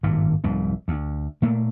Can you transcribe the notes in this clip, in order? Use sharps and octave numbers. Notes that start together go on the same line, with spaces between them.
G#1 G2 A#2
F1 C2 G#2
D2
A#2 A3 A#3